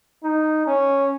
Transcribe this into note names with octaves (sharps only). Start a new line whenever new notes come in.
D#4
C#4